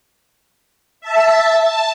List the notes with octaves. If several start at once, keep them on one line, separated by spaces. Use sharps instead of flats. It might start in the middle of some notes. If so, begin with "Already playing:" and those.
E5 A5
A5